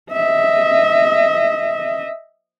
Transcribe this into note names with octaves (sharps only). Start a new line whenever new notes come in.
D#5 E5